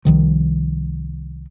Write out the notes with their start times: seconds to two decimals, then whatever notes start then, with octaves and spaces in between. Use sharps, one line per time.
0.05 C2 D#3 F3